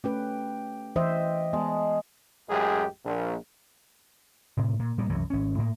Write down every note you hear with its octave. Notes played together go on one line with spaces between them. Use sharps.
A3 C#4 G4 B4
E3 G4 C5 D#5 E5
G#3 B3 A5
A1 F#2 G#3 G4 G#4
A#1
A2 C3
A#2
A#2 G3 A#3 B3
C2 F#2 E3 F#3
G#1 C#4
A2 A#3